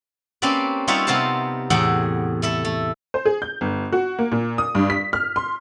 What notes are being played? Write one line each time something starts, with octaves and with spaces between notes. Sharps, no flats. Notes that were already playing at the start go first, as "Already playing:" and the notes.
A#3 C4 C#4 G4 B4 D5
G3 D#4 F4 C#5 E5 F#5
C3 B3 F4 A#4 C5 A5
E2 A2 G#4 F#5 G5
A3 E4 A4
A3
C5
G#4
G6
G1
F#4
A#3
A#2
D#6
G2
B6
F6
C6